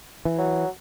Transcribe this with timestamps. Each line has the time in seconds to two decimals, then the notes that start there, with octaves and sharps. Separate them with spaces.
0.25 E3
0.38 F#3